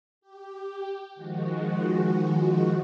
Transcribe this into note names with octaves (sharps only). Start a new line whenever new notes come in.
G4
D#3 F3 G#3 F#4